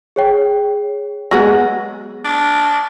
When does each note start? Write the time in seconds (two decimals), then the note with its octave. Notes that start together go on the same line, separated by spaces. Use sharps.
0.16 G#4 C#5 G5
1.31 F#3 G#3 B3 A#6
2.24 D4